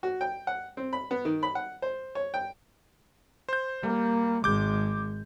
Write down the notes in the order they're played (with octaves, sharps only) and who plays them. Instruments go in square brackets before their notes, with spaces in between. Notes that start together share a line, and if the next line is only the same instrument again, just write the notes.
[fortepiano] F#4
G5
F#5
C4
B5
B3
D#3
B5
F#5
C5
C#5
G5
[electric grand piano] C5 G6
[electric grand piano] G3 [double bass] A#3
[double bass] G#1 G#3 [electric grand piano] D6 G6